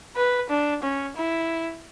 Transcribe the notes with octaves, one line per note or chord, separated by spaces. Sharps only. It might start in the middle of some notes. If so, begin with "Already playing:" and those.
B4
D4
C#4
E4